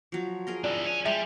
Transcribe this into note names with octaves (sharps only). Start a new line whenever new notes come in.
F3 F#3
G#4 A#4 D#5
D4 E4 D5
C#5 G#5
G3 G#3 E5